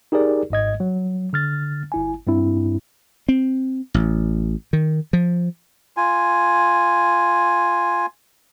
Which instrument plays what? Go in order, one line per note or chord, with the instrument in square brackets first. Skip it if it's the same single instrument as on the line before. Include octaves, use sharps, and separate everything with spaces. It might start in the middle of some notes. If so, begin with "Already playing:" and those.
[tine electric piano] D#4 G4 G#4 A#4 D5
G#1 G#2 D#5 G#6
F#3
D3 F6 A6
G1 E4 G#5
G2 C4 E4
[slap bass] C4
A1
D#3
F3
[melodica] F4 G#5